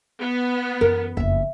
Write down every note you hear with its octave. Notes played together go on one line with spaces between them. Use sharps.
B3
F#2 E3 A#4
F#1 F2 E5